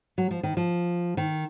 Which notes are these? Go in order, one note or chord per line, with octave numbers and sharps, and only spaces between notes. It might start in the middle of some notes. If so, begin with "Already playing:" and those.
F#3
F3
D#3
F3
D#3